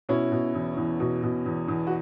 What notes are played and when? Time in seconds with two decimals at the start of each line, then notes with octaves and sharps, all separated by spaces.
0.09 B2 C#4 E4
0.32 B2
0.54 E2
0.77 E2
1.00 B2
1.23 B2
1.46 E2
1.68 E2
1.87 F#4